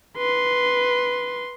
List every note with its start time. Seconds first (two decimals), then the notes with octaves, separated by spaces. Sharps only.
0.18 B4 C6